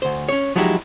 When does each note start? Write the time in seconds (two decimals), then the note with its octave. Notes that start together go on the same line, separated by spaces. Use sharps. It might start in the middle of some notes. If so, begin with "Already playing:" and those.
0.02 D2 C5
0.29 C#4 C#5
0.55 F3 F#3 G#3 D#4 E4 G4